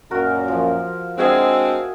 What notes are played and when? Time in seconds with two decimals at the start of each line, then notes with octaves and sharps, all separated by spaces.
0.11 F#2 A#2 C#4 F#4 A#4
0.48 F3
1.18 G#3 C4 D4 F#4 G#4 E5